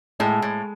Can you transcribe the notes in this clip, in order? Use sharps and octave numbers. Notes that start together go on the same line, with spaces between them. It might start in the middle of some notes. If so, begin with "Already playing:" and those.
A2 G#3
A2